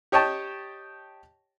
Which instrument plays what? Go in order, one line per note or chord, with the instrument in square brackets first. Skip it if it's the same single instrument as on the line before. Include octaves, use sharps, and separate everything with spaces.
[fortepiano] G4 C#5 D#5 G5 A5